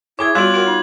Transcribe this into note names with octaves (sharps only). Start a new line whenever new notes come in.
E4 G#4 C#5 D6 G#6
G3 B3 F4 F#4 C#5 F#6 F#7
F#4 A#4 F#5
D#4